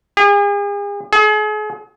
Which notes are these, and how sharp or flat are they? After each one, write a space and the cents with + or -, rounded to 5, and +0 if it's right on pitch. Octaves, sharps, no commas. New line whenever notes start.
G#4 -40
G#4 +40